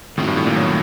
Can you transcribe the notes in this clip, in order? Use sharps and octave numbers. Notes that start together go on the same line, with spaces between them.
A2 D#3 A3 C4 D#4 F#4
G2
A2
A#2
F#3